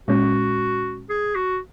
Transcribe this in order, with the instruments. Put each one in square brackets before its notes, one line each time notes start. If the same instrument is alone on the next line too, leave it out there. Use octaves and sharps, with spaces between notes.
[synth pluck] A#2 G#3 C#4 [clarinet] F#4
[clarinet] G#4
F#4